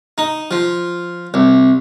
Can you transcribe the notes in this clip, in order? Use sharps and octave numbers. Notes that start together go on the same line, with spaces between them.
D#4
F3
C2